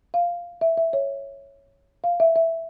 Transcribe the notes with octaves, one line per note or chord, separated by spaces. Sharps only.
F5
E5
E5
C#5
F5
E5
E5